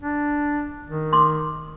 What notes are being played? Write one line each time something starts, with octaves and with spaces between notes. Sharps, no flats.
D4
D#3
C6 D6